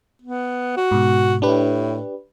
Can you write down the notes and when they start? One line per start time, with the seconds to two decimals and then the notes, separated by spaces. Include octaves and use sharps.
0.22 B3
0.77 F#4
0.91 G#2 B2
1.42 A2 D4 G4 B4